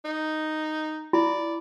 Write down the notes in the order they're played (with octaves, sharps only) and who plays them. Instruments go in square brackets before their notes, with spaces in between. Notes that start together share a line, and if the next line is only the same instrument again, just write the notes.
[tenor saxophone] D#4
[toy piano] E4 B5 [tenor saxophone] D5